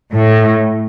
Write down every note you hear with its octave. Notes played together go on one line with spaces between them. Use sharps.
A2